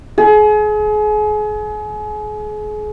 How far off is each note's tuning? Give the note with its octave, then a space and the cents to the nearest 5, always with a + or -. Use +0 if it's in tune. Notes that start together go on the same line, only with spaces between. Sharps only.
G#4 +35